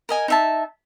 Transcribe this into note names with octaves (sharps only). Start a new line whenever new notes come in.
A#4 D#5 G#5
D#4 E5 A5